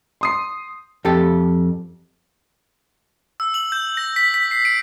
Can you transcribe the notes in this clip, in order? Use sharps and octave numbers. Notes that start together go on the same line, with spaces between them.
C6 D#6 C7
F2 G4 A4
E6
F#7
G6
A#6
B6
B6
C7
D7